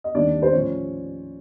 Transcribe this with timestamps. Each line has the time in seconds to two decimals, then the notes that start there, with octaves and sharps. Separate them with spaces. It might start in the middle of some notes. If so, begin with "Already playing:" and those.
0.04 D#5
0.14 D#2 D#3 G3 C4 D4 D5
0.42 C5
0.53 A2 F3 C#4 C#5